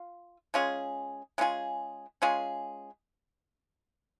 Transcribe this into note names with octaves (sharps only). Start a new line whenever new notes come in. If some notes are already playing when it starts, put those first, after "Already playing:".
Already playing: F4
G#3 C#4 F4 G#4
G#3 C#4 F4 G#4
G#3 C#4 F4 G#4